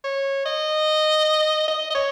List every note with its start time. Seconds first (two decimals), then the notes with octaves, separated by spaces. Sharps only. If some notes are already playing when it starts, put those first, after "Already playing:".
0.04 C#5
0.45 D#5
1.68 D#5
1.90 D#5
1.95 C#5